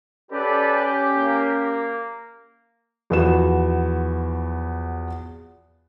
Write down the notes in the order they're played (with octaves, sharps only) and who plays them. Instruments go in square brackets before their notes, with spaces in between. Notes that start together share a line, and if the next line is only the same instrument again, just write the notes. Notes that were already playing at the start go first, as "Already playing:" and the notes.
[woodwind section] C#4 G4 [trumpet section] A4 B4 D5
[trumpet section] A#3
[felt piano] E2 F3 B3 F#4 E7